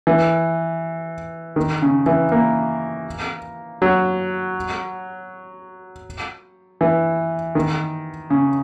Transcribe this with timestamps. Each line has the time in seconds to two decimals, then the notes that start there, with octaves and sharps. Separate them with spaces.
0.07 E3
1.56 D#3
1.82 C#3
2.06 E3
2.32 A#3
3.82 F#3
6.81 E3
7.55 D#3
8.30 C#3